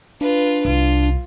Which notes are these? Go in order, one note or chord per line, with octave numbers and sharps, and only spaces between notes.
D4 F4 B4
C2 F4